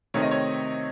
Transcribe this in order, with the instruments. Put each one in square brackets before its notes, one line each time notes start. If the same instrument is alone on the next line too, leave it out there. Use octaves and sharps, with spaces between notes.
[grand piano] C3 D#3 A3 C4 D#4 C#5
D#5
C#5